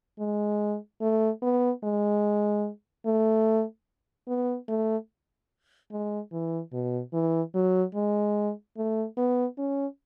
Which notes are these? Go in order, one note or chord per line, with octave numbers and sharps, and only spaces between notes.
G#3
A3
B3
G#3
A3
B3
A3
G#3
E3
B2
E3
F#3
G#3
A3
B3
C#4